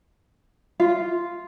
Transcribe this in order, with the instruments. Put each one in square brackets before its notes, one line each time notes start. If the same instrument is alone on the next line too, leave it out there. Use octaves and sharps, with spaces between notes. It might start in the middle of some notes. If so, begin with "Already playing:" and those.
[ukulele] F4